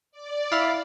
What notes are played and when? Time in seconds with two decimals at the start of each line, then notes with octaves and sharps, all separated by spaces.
0.11 D5
0.52 E4 F5 B5 F6